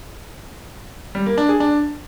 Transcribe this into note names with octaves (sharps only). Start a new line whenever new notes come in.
G3
A#3
D4
G#4
D4